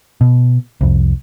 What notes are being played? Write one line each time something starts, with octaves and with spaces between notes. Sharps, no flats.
B2
C2 F2